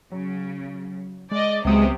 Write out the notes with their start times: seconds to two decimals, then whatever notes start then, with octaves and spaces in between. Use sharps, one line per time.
0.12 C#3 F#3
1.31 G#3 D5 D#5
1.65 C#2 C3 F#3 G#3 B3 D#6